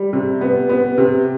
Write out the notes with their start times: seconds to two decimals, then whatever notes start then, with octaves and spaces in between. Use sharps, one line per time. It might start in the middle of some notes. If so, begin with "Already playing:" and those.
Already playing: G3
0.13 C3
0.41 B3
0.69 B3
0.98 C3